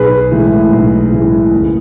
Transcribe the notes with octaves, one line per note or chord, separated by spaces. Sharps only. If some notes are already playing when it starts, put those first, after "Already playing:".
Already playing: B1 G#4 B4
A2 E3 G#3
B1
A2 E3 G#3
F#1